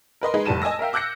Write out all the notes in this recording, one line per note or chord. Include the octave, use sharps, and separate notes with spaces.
A#4 B4 D#5 C6
G#3 D#4 G#4 B4
F1 A2 G3 A5 D#7 E7
D#5 G#5 A5 E6 A#6
A#4 E5 F5 G5
D6 E6 F#6 G6 A#6 C#7